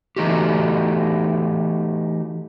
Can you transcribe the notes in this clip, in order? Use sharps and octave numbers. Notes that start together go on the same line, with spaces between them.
E3 A3 D#4 F#4 G4